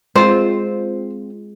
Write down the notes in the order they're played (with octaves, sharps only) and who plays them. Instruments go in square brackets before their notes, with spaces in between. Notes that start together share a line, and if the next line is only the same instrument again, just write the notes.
[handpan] G#3 [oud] C4 F4 [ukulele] C5